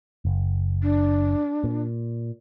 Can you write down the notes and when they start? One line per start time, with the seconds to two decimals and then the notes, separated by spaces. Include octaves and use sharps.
0.25 F#1
0.83 D4
1.64 A#2